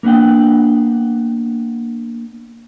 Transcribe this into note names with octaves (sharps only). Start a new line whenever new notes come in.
A#3 B3 D4 F#5 G5